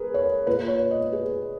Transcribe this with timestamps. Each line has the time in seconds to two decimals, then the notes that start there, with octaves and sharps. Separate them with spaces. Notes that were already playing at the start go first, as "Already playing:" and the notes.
Already playing: G#4 A#4 B4
0.14 C#5
0.47 A#2 B4
0.68 C#5
0.91 D#5
1.12 G#4